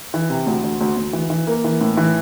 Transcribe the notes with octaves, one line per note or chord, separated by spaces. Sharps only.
E3
C3
D2
D2
D2
D2
E3
E3
A#3
E3
A2
E3